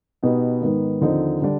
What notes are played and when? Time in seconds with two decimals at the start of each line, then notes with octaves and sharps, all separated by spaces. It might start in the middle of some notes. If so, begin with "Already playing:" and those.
0.23 B2 B3 D#4 G4
0.62 G#2 D#3 B3
1.01 D#2 D3 F3 C4 D#4
1.42 D3 G3 D4